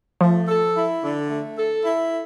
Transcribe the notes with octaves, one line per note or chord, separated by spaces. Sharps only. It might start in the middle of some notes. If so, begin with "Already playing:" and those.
F3 A3
A4
E4
D3
A3
A4
E4